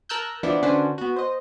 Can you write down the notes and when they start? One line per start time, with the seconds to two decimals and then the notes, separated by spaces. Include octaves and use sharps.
0.09 A#4 A5 A#5 E6 F#6 G6
0.43 E3 F3 B3 D4 E4
0.62 D3 C#4 D4 F#4 B4 C5
0.98 B3 F#4
1.16 C5 D#5